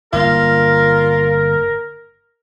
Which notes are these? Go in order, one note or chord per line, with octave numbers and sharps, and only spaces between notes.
G1 A#3 F4 A#4